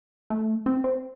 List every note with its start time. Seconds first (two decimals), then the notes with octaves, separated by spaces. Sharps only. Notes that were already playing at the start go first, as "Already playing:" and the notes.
0.30 A3
0.66 C4
0.84 C4